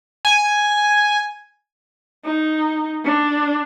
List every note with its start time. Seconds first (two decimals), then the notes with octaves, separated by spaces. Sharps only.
0.25 G#5
2.25 D#4
3.04 D4